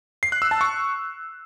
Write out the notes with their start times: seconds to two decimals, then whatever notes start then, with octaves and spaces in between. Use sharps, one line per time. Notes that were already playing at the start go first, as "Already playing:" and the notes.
0.23 C7
0.32 F#6
0.42 E6
0.51 A5
0.61 C#6